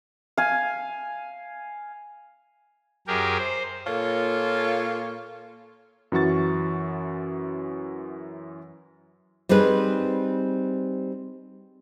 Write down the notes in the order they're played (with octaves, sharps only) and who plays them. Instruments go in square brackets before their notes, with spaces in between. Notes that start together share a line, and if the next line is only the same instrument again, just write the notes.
[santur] F5 G#5
[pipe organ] F#2 G4 G#4 A#4
C5
[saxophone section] A#2 A#3 F4 A4 C#5
[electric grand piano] F#2 E3 F#4 C#6 A6
[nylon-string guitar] G3 C4 D#4 G#4 B4